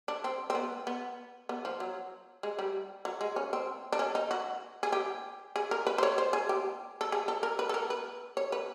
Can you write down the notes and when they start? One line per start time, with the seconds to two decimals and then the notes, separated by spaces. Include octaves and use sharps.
0.08 D4
0.24 C4
0.50 C4
0.55 B3
0.87 B3
1.49 B3
1.65 F3
1.80 F#3
2.43 G#3
2.59 G3
3.05 F#3
3.21 G#3
3.36 C#4
3.53 C4
3.92 D4
3.99 C#4
4.15 D#4
4.31 F#4
4.83 G#4
4.92 G4
5.56 G#4
5.71 A#4
5.87 B4
5.98 C5
6.03 C#5
6.18 C5
6.33 G#4
6.49 G4
7.01 A4
7.12 G#4
7.28 A4
7.43 A#4
7.59 B4
7.69 A4
7.74 A#4
7.90 B4
8.37 C#5
8.52 B4